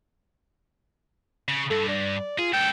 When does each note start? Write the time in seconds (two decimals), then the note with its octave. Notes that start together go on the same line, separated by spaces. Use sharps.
1.48 C#3
1.71 G2 A4
1.88 D5
2.39 F4 G#4
2.53 C#2 A4 G5